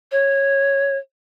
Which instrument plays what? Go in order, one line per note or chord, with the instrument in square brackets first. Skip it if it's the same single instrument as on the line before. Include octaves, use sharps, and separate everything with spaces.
[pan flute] C#5